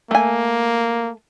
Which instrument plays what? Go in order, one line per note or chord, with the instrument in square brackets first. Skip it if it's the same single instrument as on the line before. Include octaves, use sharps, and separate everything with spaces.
[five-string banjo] A3 G#5 [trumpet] A#3